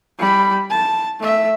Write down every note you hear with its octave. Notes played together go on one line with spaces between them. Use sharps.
G3 B5
A5
A3 E5